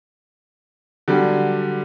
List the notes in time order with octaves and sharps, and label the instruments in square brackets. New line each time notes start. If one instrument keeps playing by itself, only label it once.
[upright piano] D3 F#3 G3